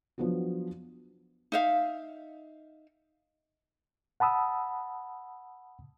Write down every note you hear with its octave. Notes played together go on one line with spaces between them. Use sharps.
F3 F#3 B3 D4 F#4
D#4 E5 F5
F#5 A5 B5 D#6 E6